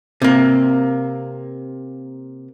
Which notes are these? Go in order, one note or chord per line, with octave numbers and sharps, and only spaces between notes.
C3 A#3